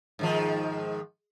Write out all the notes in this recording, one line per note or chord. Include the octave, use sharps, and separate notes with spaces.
G#2 D#3 F3